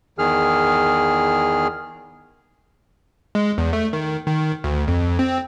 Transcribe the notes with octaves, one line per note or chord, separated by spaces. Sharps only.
E2 D#3 G#4 F6
G#3
E2
A3
D#3
D#3
D2
F2
C4